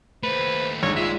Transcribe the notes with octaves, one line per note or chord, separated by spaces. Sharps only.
D#2 A3 B4 C5
A#1 G#2 C#5
G#3 F4 E5